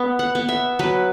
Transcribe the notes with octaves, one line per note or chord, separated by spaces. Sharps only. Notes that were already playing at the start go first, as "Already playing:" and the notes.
Already playing: B3
F#5
B3
E5
F#3 B4